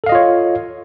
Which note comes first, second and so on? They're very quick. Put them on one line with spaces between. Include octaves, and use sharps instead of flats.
A4 F5 D#5 F4 C#5